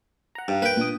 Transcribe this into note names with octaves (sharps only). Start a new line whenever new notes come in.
F#5 A#5
G2
A#3 B4 G5
A#2 D4 D#6